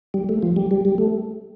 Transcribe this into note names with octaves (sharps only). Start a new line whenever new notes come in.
G3
A3
F3
G3
G3
G3
A3